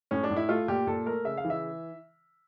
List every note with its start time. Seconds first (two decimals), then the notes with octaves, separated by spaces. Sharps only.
0.11 A2 C#4
0.23 D4
0.30 A2
0.37 E4
0.49 A3 F4
0.68 A#2 G4
0.87 A#2 A4
1.06 A3 A#4
1.25 C#3 E5
1.37 F5
1.45 E3
1.50 E5